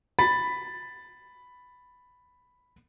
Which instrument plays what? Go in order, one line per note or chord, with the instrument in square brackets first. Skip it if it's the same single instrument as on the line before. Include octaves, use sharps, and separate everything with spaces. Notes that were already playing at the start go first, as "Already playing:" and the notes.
[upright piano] B5 A6 B6